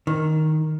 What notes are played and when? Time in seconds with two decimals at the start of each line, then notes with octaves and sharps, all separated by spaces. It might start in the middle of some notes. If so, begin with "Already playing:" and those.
0.07 D#3